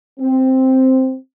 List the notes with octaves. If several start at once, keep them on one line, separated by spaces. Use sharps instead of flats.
C4